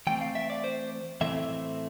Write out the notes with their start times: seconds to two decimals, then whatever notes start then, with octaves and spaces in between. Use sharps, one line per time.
0.07 E3 A3 C4 G5
0.21 F5
0.35 E5
0.50 D5
0.64 C5
1.21 A2 E3 A3 C4 E5